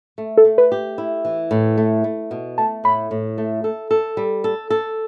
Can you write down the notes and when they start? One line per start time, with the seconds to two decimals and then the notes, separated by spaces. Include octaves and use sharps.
0.18 A3
0.37 A4
0.45 A3
0.58 B4
0.72 G4
0.98 E4
1.25 E3
1.51 A2
1.78 A3
2.04 A3
2.31 B2
2.58 A3 A5
2.84 A2 B5
3.11 A2
3.38 A3
3.64 A4
3.91 A4
4.17 G3
4.44 A4
4.70 A4